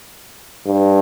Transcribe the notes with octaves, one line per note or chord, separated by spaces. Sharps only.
G2